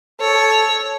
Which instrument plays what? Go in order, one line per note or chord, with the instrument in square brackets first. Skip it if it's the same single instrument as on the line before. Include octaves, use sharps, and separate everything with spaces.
[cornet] A4 [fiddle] C#5